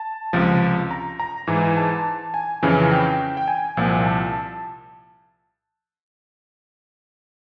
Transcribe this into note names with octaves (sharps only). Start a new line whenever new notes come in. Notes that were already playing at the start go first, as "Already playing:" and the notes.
Already playing: A5
C#2 C3 F3
A#5
A#5
G#2 E3
A5
G#5
F2 C#3 E3
G5
G5
G#5
C2 A#2 F3
A5